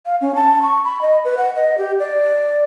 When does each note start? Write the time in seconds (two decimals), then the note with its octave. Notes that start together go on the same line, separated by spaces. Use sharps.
0.06 F5
0.21 C#4
0.35 A5
0.62 C#6
0.85 B5
1.02 D#5
1.25 B4
1.38 F#5
1.56 D#5
1.78 G4
2.00 D5